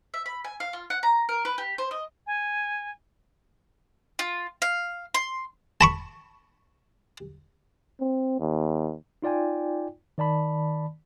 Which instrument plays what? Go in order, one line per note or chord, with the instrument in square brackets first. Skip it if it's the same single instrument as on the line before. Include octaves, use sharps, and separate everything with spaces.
[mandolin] E5
B5
G#5
F5
F4
F#5
A#5
A#4
B4
G4
C5
D#5
[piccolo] G#5
[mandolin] F4
F5
C6
[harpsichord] A5 B5 C#6
[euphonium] C4
D#2
[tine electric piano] D#4 F4 D5 G5 G#5
D#3 D5 A5 B5